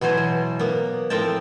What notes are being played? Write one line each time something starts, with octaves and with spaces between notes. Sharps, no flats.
B2 E3 F#3 C5 G#5
B2
A#3 B3
A2 F3 C4 A#4 G5 A5